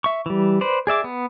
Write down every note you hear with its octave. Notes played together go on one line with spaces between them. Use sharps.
E5 C#6
E3 G3
B4 C5 D5
G#4 D5 E5 D6
B3